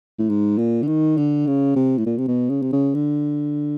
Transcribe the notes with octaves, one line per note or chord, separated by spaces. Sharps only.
A2
G#2
A#2
D3
D#3
D3
C#3
C3
A2
A#2
C3
B2
C#3
C3
C#3
D3